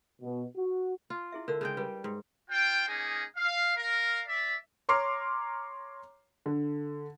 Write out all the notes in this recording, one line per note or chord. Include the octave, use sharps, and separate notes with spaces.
B2
F#4
F4
E4 G#4 E5
D3 A#4 E6
C#3 G#3 G5
G3 B4
G#2
F4 C5 G5
A#3 C#4 D#4 G#4
F5
A#4 F5
D5 E5
C#5 A#5 C6 D6 F6 C7
D3